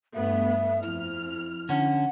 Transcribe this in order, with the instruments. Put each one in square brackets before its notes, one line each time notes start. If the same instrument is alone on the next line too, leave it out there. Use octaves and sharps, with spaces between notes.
[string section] G2 A3 B3 [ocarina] E5
[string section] F2 F6 [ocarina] E4
[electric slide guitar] D3 C#4 [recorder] F#5